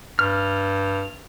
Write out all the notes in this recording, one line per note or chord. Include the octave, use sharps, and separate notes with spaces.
G2 F6